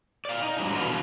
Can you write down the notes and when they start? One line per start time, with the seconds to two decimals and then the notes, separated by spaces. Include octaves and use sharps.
0.25 D5 F5
0.42 D#4
0.59 G#2 C3 F#3 G3 D4
0.73 B2 D3 E3 B3 F4